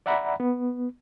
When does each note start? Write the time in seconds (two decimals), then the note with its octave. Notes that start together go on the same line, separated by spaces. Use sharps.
0.06 D5 E5 F#5 A#5 B5
0.40 B3